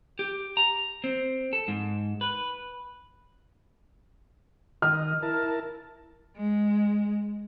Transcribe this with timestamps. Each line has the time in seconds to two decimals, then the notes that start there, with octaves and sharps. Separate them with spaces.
0.19 G4
0.57 A#5
1.04 C4
1.53 A4
1.68 G#2
2.21 B4
4.82 D#3 D#5 F6
5.23 E4 A#4 A5
6.36 G#3